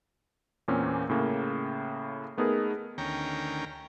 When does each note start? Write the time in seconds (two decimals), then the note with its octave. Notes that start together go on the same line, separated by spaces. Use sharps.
0.68 E2 A#2 A#3 C4 C#4
1.09 A2 C#3 A#3
2.37 A3 B3 D#4 G#4 A#4
2.98 D2 D#3 C#4 G5 A#5